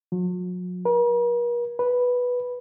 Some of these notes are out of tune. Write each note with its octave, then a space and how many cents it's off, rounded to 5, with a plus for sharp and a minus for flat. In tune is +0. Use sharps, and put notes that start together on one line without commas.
F#3 -45
A#4 +45
B4 -5